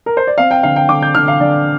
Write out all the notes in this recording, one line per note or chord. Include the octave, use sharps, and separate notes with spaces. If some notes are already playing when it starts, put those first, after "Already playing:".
A#4
C5
D5
C4 F5
G5
D3 F5
G5
D3 D6
G6
D3 F6
F5
D3 D5